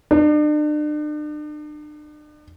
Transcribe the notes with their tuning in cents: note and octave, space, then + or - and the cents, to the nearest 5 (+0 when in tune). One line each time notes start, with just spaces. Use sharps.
D4 +40